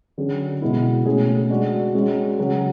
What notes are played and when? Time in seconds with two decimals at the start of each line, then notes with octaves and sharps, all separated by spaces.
0.18 D3 F#3 C#4 G#4
0.62 B2 G#3 B3 E4
1.06 B2 A3 C#4 G#4
1.50 G#3 D4 F#4
1.94 G#3 C#4 F#4
2.38 C#3 F#3 C#4 G#4